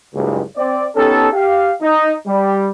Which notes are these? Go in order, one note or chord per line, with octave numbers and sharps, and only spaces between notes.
F#1 C#2 G2
C4 D5
B3 C#4 D#4 G4 A4
G4 F5
D#4
G3